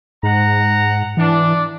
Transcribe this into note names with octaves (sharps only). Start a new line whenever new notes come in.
G#2 F#5 A#5
E3 D4